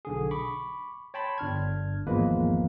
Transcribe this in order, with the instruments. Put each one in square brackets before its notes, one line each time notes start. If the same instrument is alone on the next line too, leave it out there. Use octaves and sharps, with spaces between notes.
[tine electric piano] B1 D3 G#4
B5 C#6 D6
C#5 G5 A5 B5 C6
G1 D4 F6 G#6
G#1 E2 F3 G#3 A#3 B4